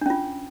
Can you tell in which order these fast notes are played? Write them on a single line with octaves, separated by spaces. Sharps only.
D4 C#4 F4